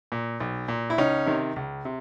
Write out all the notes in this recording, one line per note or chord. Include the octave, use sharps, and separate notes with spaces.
A#2
B1
A#2
E4
C#2 C#4 D#4
C3 D#3
C#2
C3